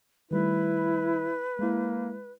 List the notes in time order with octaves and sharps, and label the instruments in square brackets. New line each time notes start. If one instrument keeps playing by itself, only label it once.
[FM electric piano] D#3 G3 A3 [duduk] E4 [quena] B4
[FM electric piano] G#3 E4 [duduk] A#3